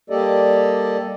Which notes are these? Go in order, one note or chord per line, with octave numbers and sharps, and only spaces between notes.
G3 A#3 G4 A4 D5 D#5